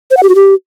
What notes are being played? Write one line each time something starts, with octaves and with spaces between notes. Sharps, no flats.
C5
F#5
G4
F#4
G4